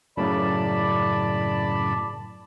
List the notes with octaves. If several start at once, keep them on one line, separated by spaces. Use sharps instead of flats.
F#2 A2 C#3 D5 A5 B5